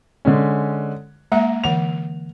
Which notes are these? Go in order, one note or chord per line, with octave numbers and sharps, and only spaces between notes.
D3 G#3 C#4
G#3 A#3 E5 A#5
D3 E3 F#5 F7